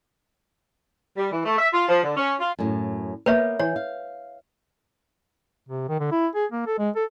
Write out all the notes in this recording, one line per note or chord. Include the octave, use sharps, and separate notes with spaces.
G3
E3
A3
E5
F4
F3
D3
C#4
F4
F#2 A2
A#3 B3 B4 C#5 E5
E3 C#5
F5
C3
D#3
D3
E4
G#4
A#3
A4
G#3
A4